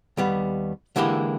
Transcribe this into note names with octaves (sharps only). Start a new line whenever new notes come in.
D#2 G3 B3
D3 E3 G#3 A#3 E4 G4